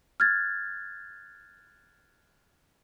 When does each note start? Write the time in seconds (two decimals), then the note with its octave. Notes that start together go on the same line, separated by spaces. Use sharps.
0.20 F6 F#6 G#6 A6